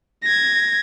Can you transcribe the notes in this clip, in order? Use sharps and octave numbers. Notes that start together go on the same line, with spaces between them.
G#6 A#6